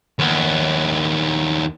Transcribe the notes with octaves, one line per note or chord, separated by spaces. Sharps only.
D#2 B3